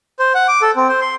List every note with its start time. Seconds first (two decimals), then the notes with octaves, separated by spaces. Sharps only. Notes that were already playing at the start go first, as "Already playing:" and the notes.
0.19 C5
0.35 F#5
0.48 D6
0.62 A4
0.76 C4
0.89 C5
1.01 C6